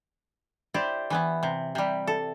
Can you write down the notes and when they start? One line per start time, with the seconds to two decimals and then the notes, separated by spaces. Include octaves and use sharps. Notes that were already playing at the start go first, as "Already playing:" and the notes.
0.74 E4 G4 C5 D5
1.10 E3 B3 E4
1.43 C3
1.75 C3 G3
2.07 A4